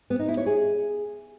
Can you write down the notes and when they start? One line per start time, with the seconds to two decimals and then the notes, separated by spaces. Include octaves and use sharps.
0.10 B3
0.19 D#4
0.28 E4
0.37 C#5
0.46 G#4